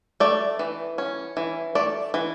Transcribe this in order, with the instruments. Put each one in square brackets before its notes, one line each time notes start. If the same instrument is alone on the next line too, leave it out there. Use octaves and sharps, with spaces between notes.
[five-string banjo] A3 D5
E3
C#4
E3
A3 D5
E3